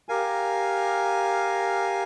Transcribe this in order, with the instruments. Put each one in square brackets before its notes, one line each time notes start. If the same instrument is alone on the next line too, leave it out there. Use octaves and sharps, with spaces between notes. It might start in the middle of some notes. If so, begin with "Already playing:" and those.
[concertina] G4 A#4 F5 G#5